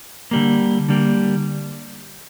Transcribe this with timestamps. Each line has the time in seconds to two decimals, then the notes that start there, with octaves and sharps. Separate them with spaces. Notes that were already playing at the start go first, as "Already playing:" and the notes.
0.31 D3 G3 A#3
0.89 D3 G3 A#3